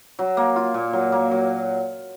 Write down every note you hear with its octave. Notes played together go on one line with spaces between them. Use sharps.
F#3
A#3
F4
A#2
F#3
A#3
F#3